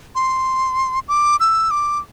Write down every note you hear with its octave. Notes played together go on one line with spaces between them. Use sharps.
C6
D6
E6
D6